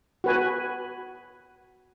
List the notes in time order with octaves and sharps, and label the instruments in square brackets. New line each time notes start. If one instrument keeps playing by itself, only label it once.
[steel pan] F#4 B4 G#5